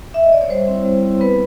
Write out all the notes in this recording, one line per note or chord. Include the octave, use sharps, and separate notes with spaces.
E5
D#5
D5
C#5
G3 C5
C4 E4
G3
C4 E4
B3 B4